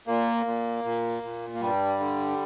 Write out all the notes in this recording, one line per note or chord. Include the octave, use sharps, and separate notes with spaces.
A#2 A#3
A#2
A#2
A#2
A#3
G2 G3
D3